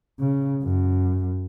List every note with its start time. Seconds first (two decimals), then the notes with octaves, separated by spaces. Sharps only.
0.20 C#3
0.63 F#2